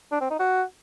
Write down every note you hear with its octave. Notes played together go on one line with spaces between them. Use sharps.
D4
C4
D#4
F#4